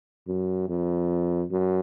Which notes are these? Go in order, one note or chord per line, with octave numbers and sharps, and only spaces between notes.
F#2
F2
F#2